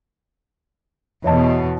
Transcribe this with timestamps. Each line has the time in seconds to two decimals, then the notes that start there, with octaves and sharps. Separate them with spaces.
1.24 E2 B2 C#5 D#5 A5